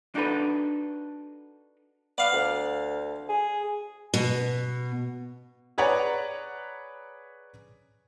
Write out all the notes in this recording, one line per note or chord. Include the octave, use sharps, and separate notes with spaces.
D4 D#4 F#4 A4 B4
B3 D5 F5
D2
G#4
B2
G#4 B4 C#5 D5 F#5 A#5